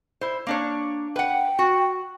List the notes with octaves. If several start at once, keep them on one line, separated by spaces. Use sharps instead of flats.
E4 C5
A#3 D4 C#5
B4 F#5 G5
F#4